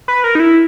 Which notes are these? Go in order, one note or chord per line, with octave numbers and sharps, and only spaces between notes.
B4
A#4
D#4
E4